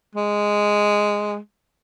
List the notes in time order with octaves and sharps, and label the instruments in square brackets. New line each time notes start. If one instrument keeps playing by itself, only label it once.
[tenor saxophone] G#3